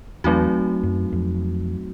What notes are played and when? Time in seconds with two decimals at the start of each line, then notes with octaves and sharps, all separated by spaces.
0.24 E2 F#3 A3 C4 D#4 F#4
0.83 F#2
1.12 F2